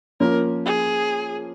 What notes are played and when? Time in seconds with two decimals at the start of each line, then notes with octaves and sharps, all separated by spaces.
0.20 F3 A#3 C#4 A#4
0.65 G#4